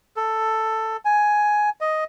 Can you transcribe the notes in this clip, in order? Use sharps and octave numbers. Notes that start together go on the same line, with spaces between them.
A4
G#5
D#5